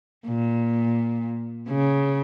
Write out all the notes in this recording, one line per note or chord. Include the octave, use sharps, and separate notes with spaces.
A#2
C#3